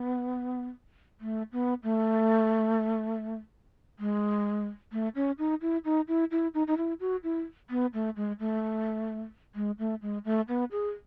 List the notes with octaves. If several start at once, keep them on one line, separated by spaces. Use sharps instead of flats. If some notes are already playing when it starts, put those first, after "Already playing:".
Already playing: B3
A3
B3
A3
G#3
A3
C#4
D#4
E4
D#4
E4
E4
D#4
D#4
E4
F#4
E4
B3
A3
G#3
A3
G#3
A3
G#3
A3
B3
G#4